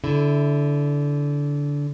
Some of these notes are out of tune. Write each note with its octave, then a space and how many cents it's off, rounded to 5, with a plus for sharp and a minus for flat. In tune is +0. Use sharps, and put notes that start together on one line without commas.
D3 -20 E4 +0